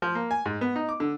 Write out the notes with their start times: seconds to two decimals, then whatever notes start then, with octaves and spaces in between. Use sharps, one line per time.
0.02 F3
0.15 A#3
0.31 G#5
0.46 G#2
0.61 B3
0.76 D#4
0.89 D6
1.00 D3